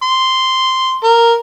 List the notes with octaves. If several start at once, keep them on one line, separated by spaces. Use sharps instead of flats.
C6
A#4